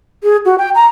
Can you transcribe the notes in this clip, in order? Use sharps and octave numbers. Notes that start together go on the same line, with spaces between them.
G#4
F#4
G5
A#5